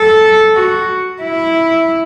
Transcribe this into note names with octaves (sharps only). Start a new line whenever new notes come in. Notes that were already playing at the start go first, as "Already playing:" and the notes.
Already playing: A4
F#4
E4